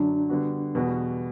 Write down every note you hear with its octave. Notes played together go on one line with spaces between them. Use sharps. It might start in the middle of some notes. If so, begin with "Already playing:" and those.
Already playing: F#2 D3 F#3 D4
D3 G3 B3 F#4
E2 B2 G3 B3 F#4